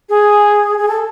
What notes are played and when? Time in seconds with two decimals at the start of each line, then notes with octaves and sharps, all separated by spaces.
0.09 G#4
0.78 G#4
0.88 A4